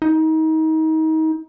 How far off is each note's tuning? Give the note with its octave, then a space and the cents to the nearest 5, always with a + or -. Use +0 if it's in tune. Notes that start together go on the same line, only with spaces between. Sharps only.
D#4 +30